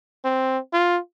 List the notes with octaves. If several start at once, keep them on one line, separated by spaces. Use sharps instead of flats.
C4
F4